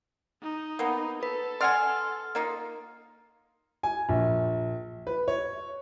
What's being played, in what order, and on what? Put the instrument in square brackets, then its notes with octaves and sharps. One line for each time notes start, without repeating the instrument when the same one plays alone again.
[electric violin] D#4
[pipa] A#3 B3
[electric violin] A4 [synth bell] B4
[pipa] D5 F#5 G#5 [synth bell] C6 F6
[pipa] A#3 D#4 F4
[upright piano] G#5
A#1
B4
C#5